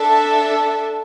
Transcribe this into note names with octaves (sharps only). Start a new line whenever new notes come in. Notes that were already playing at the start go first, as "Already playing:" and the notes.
Already playing: D4 A4 E5 A5